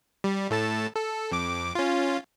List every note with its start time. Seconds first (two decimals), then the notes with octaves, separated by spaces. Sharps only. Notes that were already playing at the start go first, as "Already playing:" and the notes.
0.24 G3
0.50 A2 A4 A5
0.95 A4
1.32 F2 D6
1.75 C#4 F4